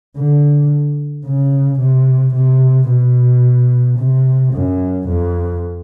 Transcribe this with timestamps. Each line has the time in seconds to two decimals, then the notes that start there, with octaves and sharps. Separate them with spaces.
0.17 D3
1.26 C#3
1.80 C3
2.35 C3
2.89 B2
3.99 C3
4.54 F#2
5.09 F2